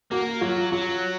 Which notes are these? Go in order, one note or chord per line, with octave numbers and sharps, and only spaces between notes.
A#3 F#4
F#3 F4
F#3 F4